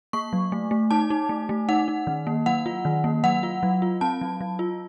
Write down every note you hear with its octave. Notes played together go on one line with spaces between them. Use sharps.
A#3 C#6
F#3
A3
A3
D#4 A5
D#4
A3
A3
D#4 F#5
D#4
D#3
A#3
F#3 F#5
F4
D#3
A#3
F#3 F#5
F4
F#3
F4
C4 A5
F#3
F#3
F4